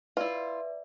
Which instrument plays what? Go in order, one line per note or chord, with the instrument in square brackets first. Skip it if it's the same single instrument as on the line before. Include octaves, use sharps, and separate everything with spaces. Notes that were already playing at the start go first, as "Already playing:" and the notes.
[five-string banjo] E4 F4 [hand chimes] B4 D5 E5